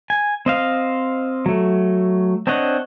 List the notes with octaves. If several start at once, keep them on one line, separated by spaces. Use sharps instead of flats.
G#5
C4 D#5 F5
F#3 A3
C4 D4 C#5 D#5 F#5